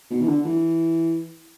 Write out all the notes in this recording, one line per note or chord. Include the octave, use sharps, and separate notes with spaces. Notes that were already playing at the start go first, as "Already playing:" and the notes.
B2
E3
D3
E3